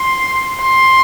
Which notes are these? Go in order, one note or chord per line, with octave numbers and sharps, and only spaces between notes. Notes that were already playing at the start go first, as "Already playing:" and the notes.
Already playing: C6
C6